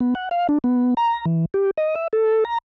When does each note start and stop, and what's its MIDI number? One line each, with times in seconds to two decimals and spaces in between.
0.01 0.14 59
0.15 0.29 78
0.31 0.47 77
0.49 0.58 62
0.64 0.94 59
0.97 1.25 82
1.26 1.45 52
1.54 1.71 67
1.77 1.95 75
1.95 2.08 76
2.13 2.44 69
2.45 2.58 82